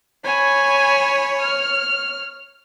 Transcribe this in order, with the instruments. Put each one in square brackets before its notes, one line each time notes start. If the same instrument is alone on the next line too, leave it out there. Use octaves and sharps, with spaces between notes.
[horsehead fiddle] C#5 [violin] G#5 B5
[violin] F6